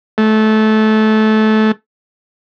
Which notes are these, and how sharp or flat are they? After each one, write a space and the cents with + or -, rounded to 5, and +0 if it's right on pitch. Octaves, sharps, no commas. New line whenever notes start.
A3 -20